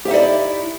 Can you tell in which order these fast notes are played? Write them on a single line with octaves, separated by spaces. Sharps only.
G4 E5 D#4 D5 E4